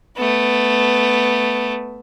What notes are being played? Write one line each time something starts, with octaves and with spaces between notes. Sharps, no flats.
A3 B3